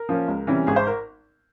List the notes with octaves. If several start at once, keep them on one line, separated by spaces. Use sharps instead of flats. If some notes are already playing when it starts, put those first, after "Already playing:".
Already playing: A#4
F3 A#3 C#4
C#2
C3 E3 G3 C#4
G#1 G#4
C5
A#4